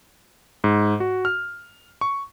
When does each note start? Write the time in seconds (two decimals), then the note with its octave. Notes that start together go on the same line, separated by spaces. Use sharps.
0.64 G#2
1.00 F#4
1.25 F6
2.01 C#6